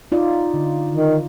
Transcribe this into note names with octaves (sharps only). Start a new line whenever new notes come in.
D#4 F4 D5
D3
D#3